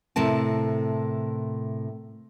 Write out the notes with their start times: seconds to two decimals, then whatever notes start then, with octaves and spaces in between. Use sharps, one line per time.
0.16 A2 C3 A#4 A5